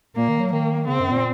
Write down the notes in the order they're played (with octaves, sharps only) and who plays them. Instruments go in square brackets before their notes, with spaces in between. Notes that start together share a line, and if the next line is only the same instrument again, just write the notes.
[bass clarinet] A#2 [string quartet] A#3
[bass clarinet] D#3
F#3
[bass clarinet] D#3 [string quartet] A#3
[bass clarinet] C#3 [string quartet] C4
[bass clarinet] F#2
A#2